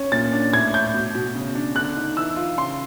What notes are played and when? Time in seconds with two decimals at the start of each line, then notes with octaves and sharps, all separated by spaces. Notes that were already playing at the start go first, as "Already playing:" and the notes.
Already playing: C#4
0.12 A#2 A6
0.33 D4
0.53 A2 G#6
0.74 A2 G6
0.94 B2
1.15 B2
1.35 C#3
1.55 D4
1.75 D3 F#6
1.96 D#4
2.17 E3 E6
2.36 F4
2.57 C#3 C6